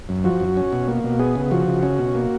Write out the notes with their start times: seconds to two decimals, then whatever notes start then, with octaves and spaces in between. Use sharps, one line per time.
0.09 F#2
0.24 F3 F#4
0.40 F#2
0.57 C#4
0.72 B2
0.88 A#3
1.04 B2
1.19 B3 G#4
1.35 C#3
1.51 F3 F#4
1.68 C#3
1.83 C#4
1.99 B2
2.15 A#3